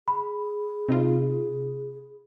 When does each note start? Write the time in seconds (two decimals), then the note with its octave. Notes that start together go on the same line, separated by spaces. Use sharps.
0.08 G#4 B5
0.89 C3 D#4 F4